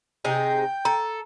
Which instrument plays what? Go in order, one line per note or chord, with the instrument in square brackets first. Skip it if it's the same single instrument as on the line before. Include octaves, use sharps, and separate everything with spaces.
[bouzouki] C3 D#4 G#4 [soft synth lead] G5
[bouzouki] A4 [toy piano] A#5